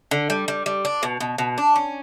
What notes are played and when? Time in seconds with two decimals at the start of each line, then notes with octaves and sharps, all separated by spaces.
0.11 D3
0.30 G3
0.48 G3
0.66 G3
0.85 D4
1.03 B2
1.20 B2
1.38 B2
1.58 D4
1.76 C#4